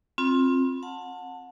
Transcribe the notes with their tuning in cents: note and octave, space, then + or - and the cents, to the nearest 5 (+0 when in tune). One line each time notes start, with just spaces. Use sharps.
C4 +20 F4 +10 B5 +0
F#5 -25 A5 +15